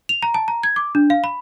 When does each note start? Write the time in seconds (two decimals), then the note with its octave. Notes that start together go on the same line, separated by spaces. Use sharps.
0.09 F7
0.23 A#5
0.34 A5
0.48 A#5
0.63 G#6
0.76 D6
0.95 D4
1.10 F5
1.24 B5